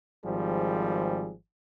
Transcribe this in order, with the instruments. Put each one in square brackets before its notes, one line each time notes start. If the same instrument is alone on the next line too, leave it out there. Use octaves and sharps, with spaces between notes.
[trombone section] G#1 F3 G3 G#4